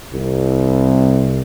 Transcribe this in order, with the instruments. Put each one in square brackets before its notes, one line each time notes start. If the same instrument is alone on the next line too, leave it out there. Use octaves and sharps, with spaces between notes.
[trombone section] C2